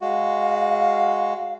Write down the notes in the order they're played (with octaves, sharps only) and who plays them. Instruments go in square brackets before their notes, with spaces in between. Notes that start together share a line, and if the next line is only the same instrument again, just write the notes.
[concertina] G#3 F#4 [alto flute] F5